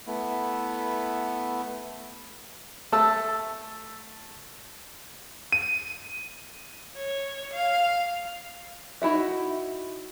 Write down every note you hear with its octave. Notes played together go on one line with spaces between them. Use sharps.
A3 B3 E4
A3 A4 E6
D#7
C#5
F5
D#4 E4 F#4 E5